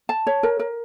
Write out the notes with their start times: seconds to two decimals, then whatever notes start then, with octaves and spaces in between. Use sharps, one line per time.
0.09 A5
0.27 C#5
0.43 A#4
0.59 A#4